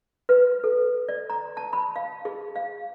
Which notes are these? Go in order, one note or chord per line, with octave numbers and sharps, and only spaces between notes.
B4
A4
D5
A#5
A5
B5
F5
G#4
F5